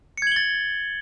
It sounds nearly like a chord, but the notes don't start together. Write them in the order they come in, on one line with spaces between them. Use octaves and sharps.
C#7 G#6 F#7 G7 A6